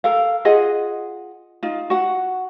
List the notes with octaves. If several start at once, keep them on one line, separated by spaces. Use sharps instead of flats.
A4 A#4 F5
F4 G#4 D#5 F#5
D#4 F4
F#4 F#5